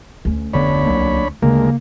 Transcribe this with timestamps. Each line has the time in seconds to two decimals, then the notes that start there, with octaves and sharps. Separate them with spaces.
0.25 D2 C#4
0.54 F1 D3 B3 D4 C#5 B5
0.86 C2 F#3 A#3
1.42 D2 C#3 G#3 A#3 A#4